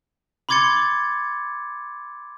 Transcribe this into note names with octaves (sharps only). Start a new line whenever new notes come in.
B5 C6 D6 G#6 A6 C#7